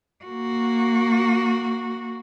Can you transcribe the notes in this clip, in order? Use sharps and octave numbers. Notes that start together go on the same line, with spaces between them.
A#3 F#4